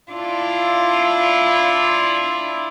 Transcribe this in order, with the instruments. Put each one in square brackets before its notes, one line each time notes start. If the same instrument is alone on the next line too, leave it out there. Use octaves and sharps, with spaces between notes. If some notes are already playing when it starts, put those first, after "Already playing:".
[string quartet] D4 E4 F4 D5